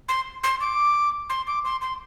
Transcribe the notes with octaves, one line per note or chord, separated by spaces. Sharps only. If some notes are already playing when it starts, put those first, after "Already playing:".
C6
C6
D6
C6
D6
C6
C6